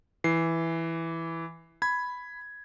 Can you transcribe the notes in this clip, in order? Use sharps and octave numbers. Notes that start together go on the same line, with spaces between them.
E3 C7
B5 G#6